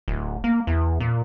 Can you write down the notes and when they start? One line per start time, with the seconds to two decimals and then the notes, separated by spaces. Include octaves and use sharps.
0.08 D1
0.44 A#3
0.67 E2
1.00 A#2